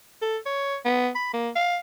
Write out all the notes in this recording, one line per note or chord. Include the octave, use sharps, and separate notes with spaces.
A4
C#5
B3
B5
A#3
F5